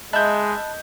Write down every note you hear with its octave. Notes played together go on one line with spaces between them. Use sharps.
G#3 D#5 E5 A5 B5 F#6 G6